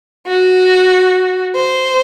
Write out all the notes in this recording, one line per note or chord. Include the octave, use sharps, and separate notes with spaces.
F#4
C5